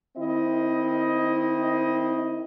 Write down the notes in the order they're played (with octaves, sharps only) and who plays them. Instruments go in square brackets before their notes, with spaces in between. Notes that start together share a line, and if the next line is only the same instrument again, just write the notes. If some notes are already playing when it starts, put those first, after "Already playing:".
[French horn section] D#3 C4 E4 D#5